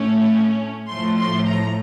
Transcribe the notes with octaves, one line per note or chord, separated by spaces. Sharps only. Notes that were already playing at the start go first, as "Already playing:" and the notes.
Already playing: A2 A3 C#4
A2 F3 A3 C6
C6
A#5